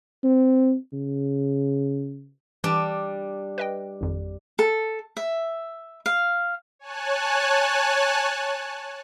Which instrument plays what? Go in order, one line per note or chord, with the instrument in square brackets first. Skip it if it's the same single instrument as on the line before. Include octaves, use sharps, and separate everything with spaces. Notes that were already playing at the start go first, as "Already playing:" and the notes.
[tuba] C4
C#3
[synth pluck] E3 [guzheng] G3 D4
[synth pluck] B4 D#5 G5
G#1 F2
[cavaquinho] A4
E5
F5
[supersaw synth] C#5 G#5 A5 F#6